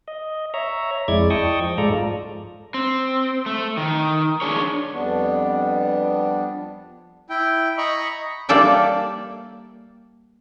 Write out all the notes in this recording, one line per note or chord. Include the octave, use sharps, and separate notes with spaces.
D#5
C#5 E5 A#5
F2 G#3 E4 D5 G#6
D#5 G5 A5 C#6 D#6
F3
G#2 G#3 F4 A4 D5 A#5
C4
A3
D#3
D4 G#4 C#5
F2 G3 B3 D4
E4 G5
D#5 A#5 B5 C#6
G3 A#3 A4 D5 E5 G5